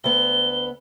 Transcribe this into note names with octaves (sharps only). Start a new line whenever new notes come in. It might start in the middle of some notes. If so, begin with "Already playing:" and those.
D2 B3 G7